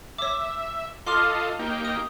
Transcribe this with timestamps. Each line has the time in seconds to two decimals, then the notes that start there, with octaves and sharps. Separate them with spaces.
0.18 C#5 E5 D6
1.07 F4 A4 D#5 C6 D6 F6
1.59 A#3 D#4 G4
1.85 D#6